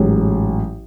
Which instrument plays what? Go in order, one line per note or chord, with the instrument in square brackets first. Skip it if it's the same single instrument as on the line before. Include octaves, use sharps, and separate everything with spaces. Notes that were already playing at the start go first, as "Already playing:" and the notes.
Already playing: [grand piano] A1 G#2 F#3